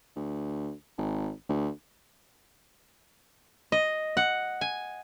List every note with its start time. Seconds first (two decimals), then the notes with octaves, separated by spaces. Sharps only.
0.16 D2
0.98 G#1
1.50 D2
3.72 D#5
4.17 F#5
4.61 G#5